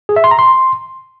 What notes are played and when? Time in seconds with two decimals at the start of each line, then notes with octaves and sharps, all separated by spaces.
0.09 G#4
0.16 E5
0.24 C6
0.31 A#5
0.39 C6